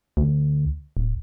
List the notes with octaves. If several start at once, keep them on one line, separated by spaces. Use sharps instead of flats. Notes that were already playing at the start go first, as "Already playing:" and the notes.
D2
D1